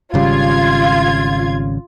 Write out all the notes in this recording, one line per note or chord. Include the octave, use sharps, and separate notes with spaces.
G#1 C#3 G3 F4 G#6